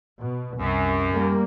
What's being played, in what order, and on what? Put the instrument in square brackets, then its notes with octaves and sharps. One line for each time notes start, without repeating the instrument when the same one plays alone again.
[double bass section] B2
[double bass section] C2 [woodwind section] F#2
[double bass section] G3 A#3